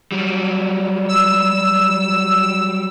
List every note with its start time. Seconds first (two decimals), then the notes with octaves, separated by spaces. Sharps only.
0.12 F#3 G3
1.09 E6